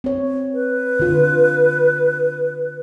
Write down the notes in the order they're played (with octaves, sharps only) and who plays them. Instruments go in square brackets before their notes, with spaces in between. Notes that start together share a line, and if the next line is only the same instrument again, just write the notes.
[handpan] C4 C#5
[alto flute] B4
[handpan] D3 F4